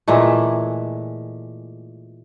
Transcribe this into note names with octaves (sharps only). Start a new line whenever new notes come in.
A#2 E3 G#3 A3